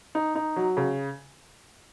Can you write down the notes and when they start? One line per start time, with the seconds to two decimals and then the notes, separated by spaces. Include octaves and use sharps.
0.15 D#4
0.35 D#4
0.56 F#3
0.77 C#3